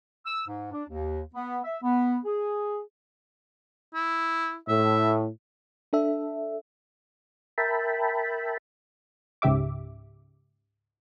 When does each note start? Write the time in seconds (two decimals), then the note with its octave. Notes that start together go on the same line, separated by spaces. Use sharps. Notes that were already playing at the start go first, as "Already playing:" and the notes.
0.26 E6
0.48 G#2
0.72 D4
0.89 D#2
1.34 B3
1.64 E5
1.83 B3
2.25 G#4
3.94 E4
4.68 A2 E5
5.93 D4 A4 E5
7.58 A#4 E5 G5 A5 B5
9.42 C#2 G#2 C#3 G4 E5 D6